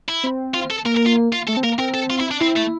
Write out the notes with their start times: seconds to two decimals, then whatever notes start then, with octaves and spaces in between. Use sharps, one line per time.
0.09 E4
0.24 C4
0.54 F4
0.70 A4
0.85 A#3 A#4
0.97 A#4
1.06 F4
1.32 F4
1.47 A3 A4
1.57 C4
1.64 A#3 A#4
1.78 C4 A#4
1.94 A4
2.10 F4
2.20 E4
2.31 D4
2.41 C4 E4
2.56 A3